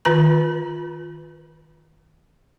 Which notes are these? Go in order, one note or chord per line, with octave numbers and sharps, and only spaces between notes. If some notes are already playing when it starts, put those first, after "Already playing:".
D#3 F4 B4 A#5